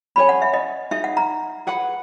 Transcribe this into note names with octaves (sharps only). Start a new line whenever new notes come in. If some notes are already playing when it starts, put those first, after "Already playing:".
C#4 G#4 C#5 G#5 B5
F#5
E5
D#5
D#4 G#4 D#5 E5
F#5
A#5
G#4 B4 F#5 B5